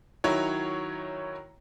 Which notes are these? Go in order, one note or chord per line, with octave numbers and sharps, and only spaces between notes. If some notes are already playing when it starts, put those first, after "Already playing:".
D#3 F#3 E4 C#5